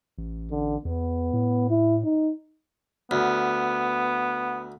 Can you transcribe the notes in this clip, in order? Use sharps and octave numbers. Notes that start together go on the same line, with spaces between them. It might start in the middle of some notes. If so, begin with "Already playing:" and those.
A1
D3
E2 B3
A2
E4
D#4
D2 B3